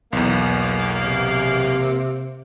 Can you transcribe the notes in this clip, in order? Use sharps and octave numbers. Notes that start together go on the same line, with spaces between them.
B1 E2 A#3
C3